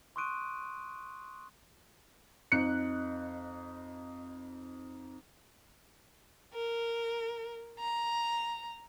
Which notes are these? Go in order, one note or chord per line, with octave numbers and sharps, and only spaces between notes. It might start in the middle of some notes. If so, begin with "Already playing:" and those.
C6 C#6 D#6 F#6 D7 D#7
F2 D#4 F#6 C#7
A#4
A#5